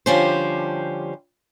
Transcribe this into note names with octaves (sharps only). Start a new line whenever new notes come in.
D3 F3 G3 C#4 G4 C5